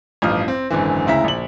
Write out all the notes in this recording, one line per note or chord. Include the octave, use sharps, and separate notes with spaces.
A1 G2 F3 D#6 F6
C4
G#1 F#2 D3 E3
D2 C#3 E4 E5 A#5 B6
A#1 F#7